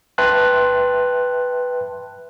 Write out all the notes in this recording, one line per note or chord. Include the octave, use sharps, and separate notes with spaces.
B4 E5 G5 A5 C6 F#6